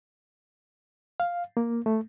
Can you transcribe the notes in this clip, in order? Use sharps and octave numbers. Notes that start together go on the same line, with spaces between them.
F5
A#3
A3